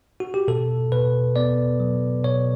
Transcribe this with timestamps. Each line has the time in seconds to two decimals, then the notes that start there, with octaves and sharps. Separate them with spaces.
0.20 F#4
0.34 G4
0.48 B2 A4
0.92 B2 B4
1.36 B3 D5
1.80 F#3
2.24 B2 C#5